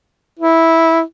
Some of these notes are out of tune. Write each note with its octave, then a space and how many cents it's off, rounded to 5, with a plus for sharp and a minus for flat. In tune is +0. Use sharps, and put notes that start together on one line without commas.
E4 -10